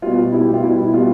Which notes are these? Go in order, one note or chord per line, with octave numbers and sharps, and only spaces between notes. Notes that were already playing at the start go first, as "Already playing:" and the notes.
B2 G3 F4
B2 G3 E4
G4
F4
B2 G3 E4
E4
B2 G3 F4